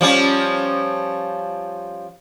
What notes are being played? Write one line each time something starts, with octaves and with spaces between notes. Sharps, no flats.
F3 G3 C#4